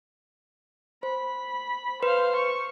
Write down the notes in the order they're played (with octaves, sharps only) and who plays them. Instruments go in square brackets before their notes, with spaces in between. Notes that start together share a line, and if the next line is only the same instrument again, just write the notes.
[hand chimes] C5 [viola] B5
[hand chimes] B4 [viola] C5 F5
[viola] C#6